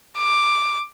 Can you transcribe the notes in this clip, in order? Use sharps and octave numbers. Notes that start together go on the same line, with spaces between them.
D6